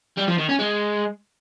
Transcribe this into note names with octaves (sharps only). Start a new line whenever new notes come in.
G3
F3
D#3
C#4
G#3